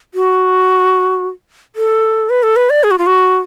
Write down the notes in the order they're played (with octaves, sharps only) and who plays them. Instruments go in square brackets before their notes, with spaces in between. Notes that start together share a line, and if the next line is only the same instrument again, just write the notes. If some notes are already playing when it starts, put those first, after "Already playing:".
[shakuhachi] F#4
A4
B4
A4
B4
D5
G#4
F#4
F4
F#4